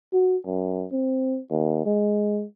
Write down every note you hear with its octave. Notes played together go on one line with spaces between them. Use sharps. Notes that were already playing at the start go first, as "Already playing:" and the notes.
F#4
F#2
C4
D#2
G#3